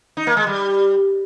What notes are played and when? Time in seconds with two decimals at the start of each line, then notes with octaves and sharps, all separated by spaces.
0.17 D#4
0.27 A#3
0.37 G#3
0.47 G3